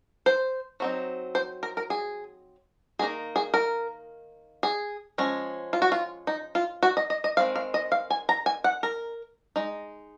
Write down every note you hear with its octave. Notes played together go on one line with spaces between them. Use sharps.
C5
F#3 C4 D#4
C5
A#4
A#4
G#4
D#3 A#3 D#4 G#4
G#4
A#4
G#4
F3 G#3 C#4
F4
F#4
F4
D#4
F4
F#4
D#5
D#5
D#5
D#3 G#3 C4 F5
F5
D#5
F5
G#5
A#5
G#5
F#5
A#4
G#3 D#4